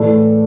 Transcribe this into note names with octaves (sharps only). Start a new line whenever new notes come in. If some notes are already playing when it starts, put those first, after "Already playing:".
Already playing: A2 E3 A3 A4 D5